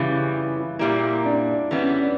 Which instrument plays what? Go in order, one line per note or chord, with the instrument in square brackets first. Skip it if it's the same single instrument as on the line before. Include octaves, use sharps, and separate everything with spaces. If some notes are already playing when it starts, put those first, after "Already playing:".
Already playing: [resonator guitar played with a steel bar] C#3 E3 G3 [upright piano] E4
[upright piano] E4
F4
E4
[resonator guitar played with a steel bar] A#2 G3 A#3 [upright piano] E4
[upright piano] D4
[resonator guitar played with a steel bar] E3 G3 B3 [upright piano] C#4
[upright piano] D4